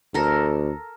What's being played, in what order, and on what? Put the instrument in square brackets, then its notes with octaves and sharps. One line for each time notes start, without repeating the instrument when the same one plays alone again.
[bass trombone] D2 [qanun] A4 A#4